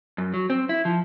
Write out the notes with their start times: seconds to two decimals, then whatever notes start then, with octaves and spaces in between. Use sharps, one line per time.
0.18 F#2
0.34 F#3
0.50 C4
0.69 E4
0.85 F3